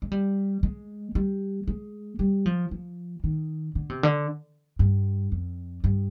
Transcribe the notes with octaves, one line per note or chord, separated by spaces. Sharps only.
G#3
G3
G#3
G3
G#3
G3
F3
F3
D#3
D3
C3
D3
G2
F2
G2